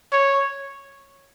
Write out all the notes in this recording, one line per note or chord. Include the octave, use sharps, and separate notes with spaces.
C#5